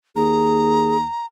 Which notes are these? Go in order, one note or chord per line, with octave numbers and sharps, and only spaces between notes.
D#2 G#4 A#5